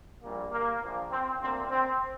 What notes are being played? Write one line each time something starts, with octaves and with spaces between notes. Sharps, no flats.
A#1 A#2 G3 A#3
A#3
A#1 A#2 F3 A#3
C4
D2 D3 A#3 C4
C4